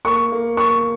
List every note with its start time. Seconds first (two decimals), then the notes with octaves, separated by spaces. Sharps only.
0.05 A#3 C#6
0.32 A#3
0.57 A#3 C#6